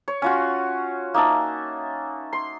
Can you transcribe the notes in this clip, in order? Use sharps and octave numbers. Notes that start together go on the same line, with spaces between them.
C#5
C#4 F4 F#4
A#3 D#4 E5 A5
C6